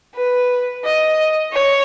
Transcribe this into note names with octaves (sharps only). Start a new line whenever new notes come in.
B4
D#5
C#5